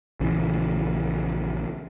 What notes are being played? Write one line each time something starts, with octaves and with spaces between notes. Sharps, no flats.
A#1 C#3 E3